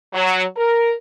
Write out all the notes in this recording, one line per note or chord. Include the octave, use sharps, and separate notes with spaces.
F#3
A#4